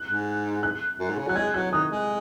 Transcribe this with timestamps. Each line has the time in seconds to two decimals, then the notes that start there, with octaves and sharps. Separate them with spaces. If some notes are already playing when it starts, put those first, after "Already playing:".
Already playing: F#6
0.09 G#2
0.63 F#6
1.00 F#2
1.09 G#2
1.18 C#3
1.27 F#3 F#6
1.36 G#3 G#6
1.54 F#3 F#6
1.72 D#3 D#6
1.91 G#3